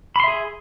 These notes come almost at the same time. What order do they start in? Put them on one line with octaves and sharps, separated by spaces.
B5 C6 E5 G#4